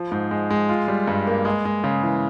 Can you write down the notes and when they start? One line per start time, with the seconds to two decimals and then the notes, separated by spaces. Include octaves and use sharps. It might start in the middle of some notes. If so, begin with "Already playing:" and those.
Already playing: F3
0.12 G#2
0.31 G#3
0.50 G#3
0.69 F4
0.88 G3
1.07 G2
1.27 A#3
1.45 G#3
1.65 G#3
1.84 C#3
2.03 E3